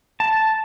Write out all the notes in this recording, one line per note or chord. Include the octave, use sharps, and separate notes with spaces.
A5